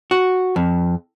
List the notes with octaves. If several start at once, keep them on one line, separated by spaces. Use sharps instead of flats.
F#4
F2